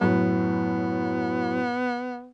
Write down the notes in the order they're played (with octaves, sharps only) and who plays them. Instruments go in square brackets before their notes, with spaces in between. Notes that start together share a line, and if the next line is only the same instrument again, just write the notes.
[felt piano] F#2 A2 [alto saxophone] B3